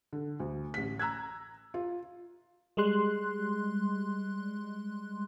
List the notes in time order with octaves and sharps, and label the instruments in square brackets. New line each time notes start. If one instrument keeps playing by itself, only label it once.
[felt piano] D3
D2
A1 B6
A#5 E6 F#6 G#6
F4
[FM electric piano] G3 G#3 C6 F#6